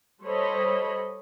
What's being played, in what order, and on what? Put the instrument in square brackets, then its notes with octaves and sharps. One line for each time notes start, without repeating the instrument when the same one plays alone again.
[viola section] G3 A4 C5 C#5 D#5 B5